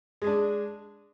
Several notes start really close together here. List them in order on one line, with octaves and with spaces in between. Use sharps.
G#3 G#4 D4